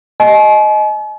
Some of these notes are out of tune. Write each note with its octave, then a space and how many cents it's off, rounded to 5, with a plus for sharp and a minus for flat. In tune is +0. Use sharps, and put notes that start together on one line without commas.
D#5 +0 G#5 +45